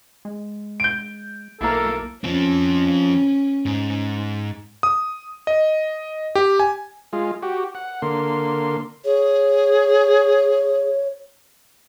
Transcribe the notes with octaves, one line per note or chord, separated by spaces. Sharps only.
G#3
G6 D7
B1 A#3 E4 A4 A#4
F3 C4 C#4
G#2
D#6
D#5
G4
G#5
G#3 F4
F#4 G4
F#5
D3 A#3 C6
G#4 C#5